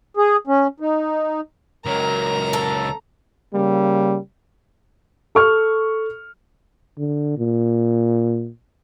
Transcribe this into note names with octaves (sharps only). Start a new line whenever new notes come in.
G#4
C#4
D#4
C#2 F#3 A#4 A#5
A4
C#3 G3 A#3
A4 C#6 F6
D3
A#2